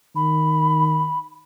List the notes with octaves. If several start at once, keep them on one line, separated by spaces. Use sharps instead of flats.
D#3 B5